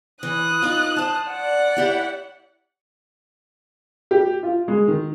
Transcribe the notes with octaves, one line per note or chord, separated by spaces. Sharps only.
E3 D#6 F#6
D#4 F4
C5 A5
D5 F#5
E4 G4
G4
F4
G#3
D#3